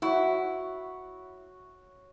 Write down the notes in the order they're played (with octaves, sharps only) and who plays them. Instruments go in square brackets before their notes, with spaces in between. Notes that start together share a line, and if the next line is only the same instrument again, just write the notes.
[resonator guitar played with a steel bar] E4 [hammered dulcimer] F#4 C#5